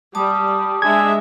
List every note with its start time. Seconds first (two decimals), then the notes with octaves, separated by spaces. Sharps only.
0.15 G3 A5 D6 D#6
0.82 G#3 D4 G#4 E5 G#6